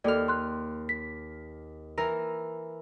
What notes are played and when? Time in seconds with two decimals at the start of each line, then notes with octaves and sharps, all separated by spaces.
0.04 D#2 F#4 A4 D5 F6
0.28 C6 F#6
0.89 B6
1.98 E3 A#4 A#5